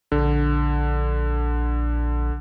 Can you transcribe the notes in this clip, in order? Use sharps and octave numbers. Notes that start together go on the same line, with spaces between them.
A#1 D3